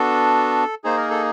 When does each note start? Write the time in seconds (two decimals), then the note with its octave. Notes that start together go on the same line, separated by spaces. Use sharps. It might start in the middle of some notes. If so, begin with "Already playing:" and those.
Already playing: B3 D4 F#4 A4
0.84 A#3 D#4 G#4 C5
0.97 A#4
1.11 A4